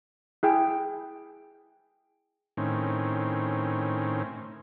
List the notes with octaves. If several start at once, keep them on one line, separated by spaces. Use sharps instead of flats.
E4 G#4 G5
A2 D#3 C4 C#4